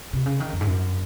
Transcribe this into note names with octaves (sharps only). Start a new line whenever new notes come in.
C3
C#3
D#3
F2
G#2
F#2